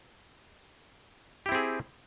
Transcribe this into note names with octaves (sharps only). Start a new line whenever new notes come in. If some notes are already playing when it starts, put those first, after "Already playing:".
C4 E4 G4 G#4